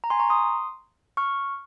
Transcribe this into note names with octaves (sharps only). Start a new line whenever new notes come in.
A#5
G#5 C6
A#5 C#6
C6 D#6
C#6 F6